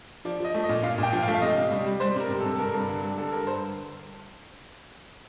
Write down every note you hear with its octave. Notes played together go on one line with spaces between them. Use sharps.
F3 D5
F3 D#5
A3
D#5
A#2
A#2 F5
A#2
G5
F3
F5
A3
F5
C3 D#5
C3
G3
G3
G3 C5
C3 A#4
C3
A4
C3
A4
G2 A#4
G2
D3
G3
D3 A4
G2 A#4
G2 C5